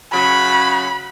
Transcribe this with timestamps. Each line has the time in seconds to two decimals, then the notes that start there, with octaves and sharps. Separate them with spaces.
0.13 C#3 F#3 B5